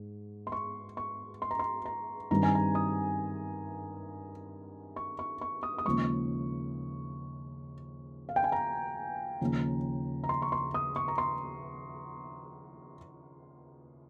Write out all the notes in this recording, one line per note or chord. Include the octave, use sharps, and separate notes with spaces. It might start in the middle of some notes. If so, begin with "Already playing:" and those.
Already playing: G#2
C6
C#6
C#6
C6
A#5
C6
A#5
G2 D#3 G3 C4 A#5
G#5
A#5
D#6
C#6
C#6
C#6
D#6
D#6
D#2 C#3 F3 G#3 C#6
F5
G5
G#5
A#5
D#2 C#3 F3
A#5
C6
C#6
C6
D#6
C#6
A#5
C6